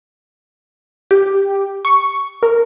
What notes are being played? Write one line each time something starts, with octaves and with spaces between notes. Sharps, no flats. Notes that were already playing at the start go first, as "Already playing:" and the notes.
G4
C#6
A#4